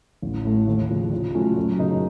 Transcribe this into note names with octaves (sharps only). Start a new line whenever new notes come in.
A1
A2 A3
D#2
C#3 F3
A#2
F#3 A3 C#4 F4
F#2
C#3 F#3 A#3 D#4